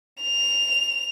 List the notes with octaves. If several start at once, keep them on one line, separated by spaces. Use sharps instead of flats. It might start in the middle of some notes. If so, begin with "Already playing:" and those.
F7